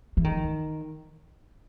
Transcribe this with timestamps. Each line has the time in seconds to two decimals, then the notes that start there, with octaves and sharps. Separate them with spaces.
0.17 E3
0.24 D#3